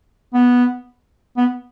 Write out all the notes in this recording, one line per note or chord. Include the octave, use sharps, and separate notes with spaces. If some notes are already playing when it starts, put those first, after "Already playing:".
B3
B3